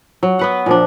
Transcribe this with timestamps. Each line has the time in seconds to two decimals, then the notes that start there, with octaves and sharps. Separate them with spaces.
0.23 F#3
0.39 B3 B4 F#5
0.66 A#2 F3 D4